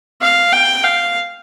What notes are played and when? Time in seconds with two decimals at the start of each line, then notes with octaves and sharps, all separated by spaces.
0.21 F5
0.52 G5
0.84 F5